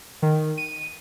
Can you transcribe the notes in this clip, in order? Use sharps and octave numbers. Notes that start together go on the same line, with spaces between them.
D#3
D#7